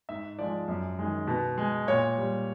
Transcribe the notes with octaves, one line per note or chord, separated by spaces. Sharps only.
G#2 E5
F3 G#3 D5
F#2
D#3 G#3
B2
G#3
A#2 C#5
G3